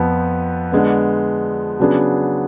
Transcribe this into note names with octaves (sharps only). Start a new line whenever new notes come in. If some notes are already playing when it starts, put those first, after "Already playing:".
Already playing: F2 F3 B3
D3 G#3 B3
C#3 F#3 B3 D4 G#4